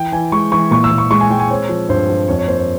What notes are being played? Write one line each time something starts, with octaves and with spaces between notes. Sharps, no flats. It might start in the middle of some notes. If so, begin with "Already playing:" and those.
Already playing: E3 G5
E3 G#5
G#3 C#6
E3 C#6
A#2 C#6
E6
A#2
C#6
G#3 C#6
G#5
G#3 G5
G#5
C4 C#5
F3
G2 C5
F3
F2 C#5
C#5
A#3 C5
C#5